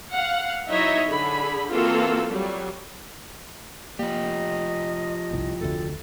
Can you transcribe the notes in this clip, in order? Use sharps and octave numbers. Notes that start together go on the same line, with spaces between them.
F5 F#5
F#3 D#4 E4 C#5 D#5 E5
D3 G#4 B5
E3 A#3 C4 F4 F#4 A4
F#3 G3
F3 A#3 G4 D#5
G1 C2
F1 D2 A4